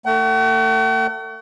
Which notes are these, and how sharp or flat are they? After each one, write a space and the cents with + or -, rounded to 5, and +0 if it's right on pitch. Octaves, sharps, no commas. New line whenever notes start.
A3 +35 F#5 +45